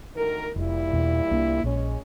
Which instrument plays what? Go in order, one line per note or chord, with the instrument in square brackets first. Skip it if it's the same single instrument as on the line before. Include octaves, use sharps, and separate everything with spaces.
[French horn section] D2 D#3 A#4
[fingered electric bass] F1 [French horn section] A#2 G3 E4
[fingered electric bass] E2 B2 E3
C2 A#3 D4
[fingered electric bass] A#1 [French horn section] G#3 C#4